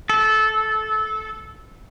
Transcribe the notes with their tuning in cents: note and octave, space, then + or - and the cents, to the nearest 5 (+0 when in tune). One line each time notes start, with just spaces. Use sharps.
A4 -20